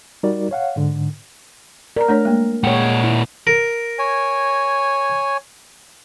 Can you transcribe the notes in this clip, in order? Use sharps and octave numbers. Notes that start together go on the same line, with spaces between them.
G3 D#4 F#4 A#4 D5
C#5 F5 F#5
G#2 D3
A#4 D5 A#5
A3 D4 C#5
G#3 A#3
A#2 G#3 C#5 F#5 G5
E4
A#4
C#5 G#5